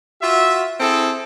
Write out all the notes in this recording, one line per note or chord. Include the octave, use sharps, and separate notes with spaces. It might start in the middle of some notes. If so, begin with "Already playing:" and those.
F4 F#4 E5
C4 E4 G#4 A4